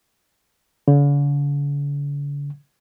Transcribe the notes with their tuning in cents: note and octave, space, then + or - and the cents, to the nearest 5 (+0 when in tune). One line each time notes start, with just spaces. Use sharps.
D3 -45